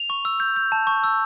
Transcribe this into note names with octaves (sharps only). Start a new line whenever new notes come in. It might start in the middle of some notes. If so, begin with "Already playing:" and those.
Already playing: F7
C#6
E6
G6
G6
A5
C#6
E6